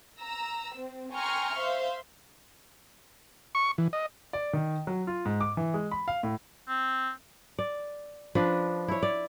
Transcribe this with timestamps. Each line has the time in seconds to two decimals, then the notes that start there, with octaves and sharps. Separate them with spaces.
0.20 A#5 E6
0.74 C4
1.13 G5 G#5 A#5 C6 C#6 F6
1.57 C5 E5 F5 C6
3.55 C#6
3.78 E3
3.93 D#5
4.33 D5
4.53 D#3
4.87 F#3
5.07 F4
5.25 G#2
5.41 D6
5.57 E3
5.74 G#3
5.91 B5
6.08 F5
6.23 A2
6.69 C4
7.59 D5
8.35 F3 D4 B4
8.88 E4 C#5
9.03 D5